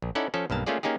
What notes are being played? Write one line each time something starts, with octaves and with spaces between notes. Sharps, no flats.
A#1
C#4 D#4 E4 A4 D5 F#5
F3 C#4 A4
B1 G2 A#3 A5
A3 A#3 C#4 F4 G#4 D5
A#3 C#4 D#4 G4 G#4